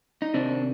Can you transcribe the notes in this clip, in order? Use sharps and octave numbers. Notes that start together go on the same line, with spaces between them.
D#4
C3 D#3 C4 D4